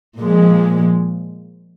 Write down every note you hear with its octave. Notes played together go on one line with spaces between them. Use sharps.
A#2 F3 G#3